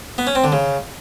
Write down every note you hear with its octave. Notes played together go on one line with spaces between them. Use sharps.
B3
C#4
C4
D3
C#3